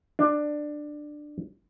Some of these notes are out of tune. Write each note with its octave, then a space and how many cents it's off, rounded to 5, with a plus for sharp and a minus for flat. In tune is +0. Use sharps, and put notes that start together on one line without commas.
D4 +15